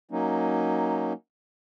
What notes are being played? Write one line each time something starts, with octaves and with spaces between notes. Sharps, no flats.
F#3 A#3 C#4 D#4